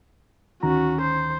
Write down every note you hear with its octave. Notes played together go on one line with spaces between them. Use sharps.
D2 D#3 C#4 F#4 A#5
C5